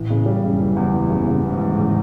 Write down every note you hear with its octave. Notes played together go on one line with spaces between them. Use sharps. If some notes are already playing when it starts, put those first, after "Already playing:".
Already playing: A1 A2 E3
C#3
G3
F#1 F#2 C#3
E3
E2
E3
C#3
C#3
G#1 G#2 E3
E3
C#3